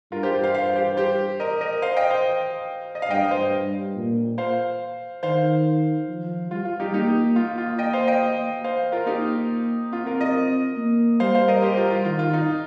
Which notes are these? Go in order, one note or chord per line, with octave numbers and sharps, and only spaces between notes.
G2 F4 A#4
G4 C5
C5 F5
C5 F5
G4 C5
G4 C5
A#4 D#5
A#4 D#5
C5 F5
D#5 G5
C5 F5
D#5
F5
G2 D#5 G5
C5 F5
A#2
C5 F5
D#3 C5 F5
F3
G3 F4
F4
D#4 G4
A#3 D#4 G4
A#3 F4
F4
D#5 G5
C5 F5
D#5 G5
C5 F5
F4 A#4
A#3 D#4 G4
C4 F4
F4 A#4
A#4 D#5
A#3
G3 C5 F5
C5 F5
A#4 D#5
G4 C5
F4 A#4
F4
D#3 F4
F4
D#4